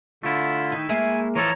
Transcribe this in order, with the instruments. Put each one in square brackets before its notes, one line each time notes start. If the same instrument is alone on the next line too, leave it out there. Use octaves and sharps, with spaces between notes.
[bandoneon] D3 F4 [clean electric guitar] A3 E4
[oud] D#3 D#4
[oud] G#3 A#3 E5 [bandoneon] G#5
[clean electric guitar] E3 F3 A4 [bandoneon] C#5 A#5